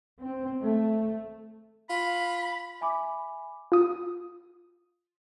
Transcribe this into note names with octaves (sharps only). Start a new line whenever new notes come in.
C4
A3
F4 B5
E5 G#5 B5 D6
F4 D#6